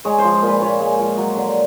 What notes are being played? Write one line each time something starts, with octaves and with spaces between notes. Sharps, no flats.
G#3 C#5
C5
F3
C5
A#2
B4
A#2 C#5
G#3
F3
F#3
D3